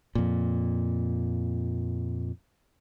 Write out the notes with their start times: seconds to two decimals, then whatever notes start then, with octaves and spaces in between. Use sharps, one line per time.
0.15 F2 A#2